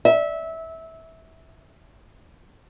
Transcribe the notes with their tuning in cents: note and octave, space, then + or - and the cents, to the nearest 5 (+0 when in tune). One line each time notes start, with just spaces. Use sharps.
E5 -20